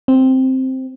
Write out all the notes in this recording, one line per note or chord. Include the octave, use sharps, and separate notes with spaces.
C4